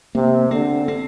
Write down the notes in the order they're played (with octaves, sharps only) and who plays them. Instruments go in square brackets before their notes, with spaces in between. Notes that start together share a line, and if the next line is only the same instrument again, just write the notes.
[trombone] C3 [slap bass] A#3
[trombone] D3 [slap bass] C4
[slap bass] C4